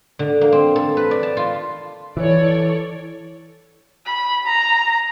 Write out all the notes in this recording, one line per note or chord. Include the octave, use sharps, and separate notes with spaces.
D3
A#3
C4
A4
B4
D5
A5
F4
E3 A4 C#5 D5
B5
A#5